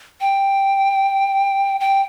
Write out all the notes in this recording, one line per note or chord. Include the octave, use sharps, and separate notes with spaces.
G5
G5